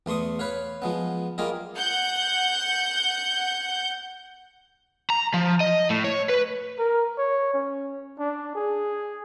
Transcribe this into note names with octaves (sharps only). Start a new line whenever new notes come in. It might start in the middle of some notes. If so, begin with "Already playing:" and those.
E2 A3 C6 C#6 D#6
B4 C#5 F5
F3 G#3 B3
G3 A#3 F4 G#4 D#5
F#5 G6
A#5
F3
D#5
A2
C#5
B4
A#4
C#5
C#4
D4
G#4